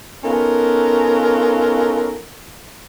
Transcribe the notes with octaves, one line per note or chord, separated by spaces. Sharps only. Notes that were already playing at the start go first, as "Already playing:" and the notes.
B3 C#4 D#4 F4 A4 A#4